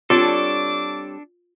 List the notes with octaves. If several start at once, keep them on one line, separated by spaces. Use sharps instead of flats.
G3 C4 D4 F4 A4 C#5 D6